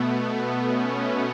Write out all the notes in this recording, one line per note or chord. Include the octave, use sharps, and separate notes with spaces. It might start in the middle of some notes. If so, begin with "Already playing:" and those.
Already playing: B2 A3 B3
C#4